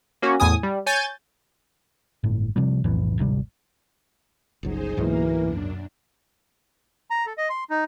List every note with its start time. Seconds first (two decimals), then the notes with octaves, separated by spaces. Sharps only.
0.22 A#3 C#4 F#4
0.40 E2 A2 G#5 D#6
0.63 G3
0.86 C#5 G#5 G6 A6
2.24 G1 A2
2.56 C3 F3 G3
2.84 B1 F2 A2 E3
3.18 D1 G#1 C3 G3
4.63 G1 C#2 F#3 D#4 G#4 C5
4.97 C#2 G#2 B2 E3 F#3 A#3 A#4
5.41 F#2 D4
7.10 A#5
7.26 A4
7.38 D#5
7.50 C6
7.70 D#4